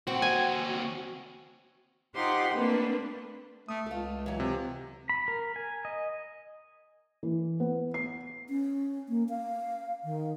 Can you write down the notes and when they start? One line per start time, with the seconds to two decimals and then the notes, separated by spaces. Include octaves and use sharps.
0.07 D#2 C4 F#4
0.22 G#5
2.15 D#4 F4 G4 C5 F#5 C6
2.52 A3 A#3 C4 D4 B4
3.68 A3 D#6
3.86 C#2 F4 A4
4.26 E3 F#3
4.40 C3
5.09 B5
5.28 A#4
5.56 G#5
5.85 D#5
7.23 E3
7.60 B3
7.94 C7
8.50 C#4
9.09 A#3
9.29 F5
10.04 D#3